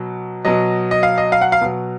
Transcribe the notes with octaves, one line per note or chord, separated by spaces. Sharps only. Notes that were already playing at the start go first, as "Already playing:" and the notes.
Already playing: B2 F#3
B2 F#3 D#5
D#5
F5
D#5
F5
F#5
F5
B2 F#3